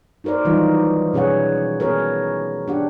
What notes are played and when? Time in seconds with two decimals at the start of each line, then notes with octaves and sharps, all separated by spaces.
0.24 D#4 F#4 A#4 C5 D5
0.45 D#3 E3 F#3 G3 D#4 F4
1.13 B2 C#4 G#4 C#5 F#5
1.80 B3 F#4 G#4 A#4 C#5
2.68 D4 G4 F#5